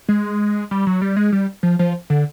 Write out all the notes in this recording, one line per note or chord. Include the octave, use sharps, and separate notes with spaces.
G#3
G3
F#3
G3
G#3
G3
F3
F3
D3